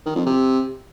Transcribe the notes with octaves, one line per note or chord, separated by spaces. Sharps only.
D#3
F2
C3